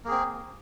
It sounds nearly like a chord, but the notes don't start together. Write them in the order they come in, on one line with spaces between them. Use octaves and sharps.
A#3 G#4 C4